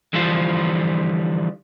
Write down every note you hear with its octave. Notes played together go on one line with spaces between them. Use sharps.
D3 E3 F3 G3 F4 C5